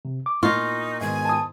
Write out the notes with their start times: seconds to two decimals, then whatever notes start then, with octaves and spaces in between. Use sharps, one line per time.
0.05 C3
0.26 D6
0.43 A#2 D#4 F4 C#6
1.01 G#2 B2 D#3 G#5
1.25 A5 D#6